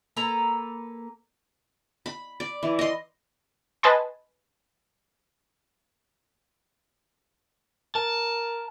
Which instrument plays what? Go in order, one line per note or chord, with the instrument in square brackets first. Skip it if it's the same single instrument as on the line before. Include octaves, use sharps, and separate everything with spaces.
[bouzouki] A#3 A4 B4 A#5
[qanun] B5
D5
E3
D#5 C6
[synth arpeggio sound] B4 D#5 G#5 A5 C6
[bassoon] A#4 [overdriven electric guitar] A5